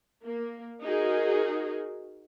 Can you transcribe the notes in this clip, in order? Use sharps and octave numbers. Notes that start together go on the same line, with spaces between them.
A#3
D#4 F#4 G#4 A#4